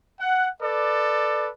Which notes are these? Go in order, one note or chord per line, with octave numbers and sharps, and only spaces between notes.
F#5
A4 B4 D5